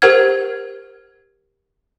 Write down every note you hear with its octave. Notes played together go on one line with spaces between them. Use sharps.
G4 A#4 C5 F#5 F6 G#6